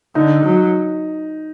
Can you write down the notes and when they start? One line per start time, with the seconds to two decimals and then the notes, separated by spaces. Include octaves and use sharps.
0.15 D3 D#4
0.44 F#3